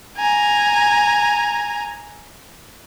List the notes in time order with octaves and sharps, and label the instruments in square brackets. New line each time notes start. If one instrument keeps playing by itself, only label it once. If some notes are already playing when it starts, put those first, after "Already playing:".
[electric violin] G#5 A#5